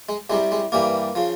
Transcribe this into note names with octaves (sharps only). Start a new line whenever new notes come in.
G#3
C2 C3 G3 G#3
G#3
G2 E3 G3 A#3
C#3 F3